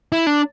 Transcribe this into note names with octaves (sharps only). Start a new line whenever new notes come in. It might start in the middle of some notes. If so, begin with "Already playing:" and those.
E4
D4